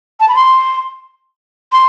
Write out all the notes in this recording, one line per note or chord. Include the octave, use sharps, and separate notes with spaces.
A5
B5
C6
C6